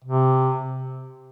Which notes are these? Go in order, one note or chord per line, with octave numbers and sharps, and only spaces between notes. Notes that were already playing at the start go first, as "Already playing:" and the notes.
C3